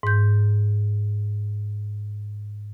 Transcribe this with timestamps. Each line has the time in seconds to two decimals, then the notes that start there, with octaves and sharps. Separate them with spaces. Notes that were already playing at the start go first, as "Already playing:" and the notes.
0.03 G#2 G6